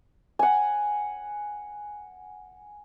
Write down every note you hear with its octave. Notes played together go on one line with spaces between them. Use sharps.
F#5 G#5